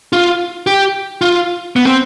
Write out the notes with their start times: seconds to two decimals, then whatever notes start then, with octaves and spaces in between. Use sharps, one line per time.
0.13 F4
0.67 G4
1.21 F4
1.76 B3
1.86 C4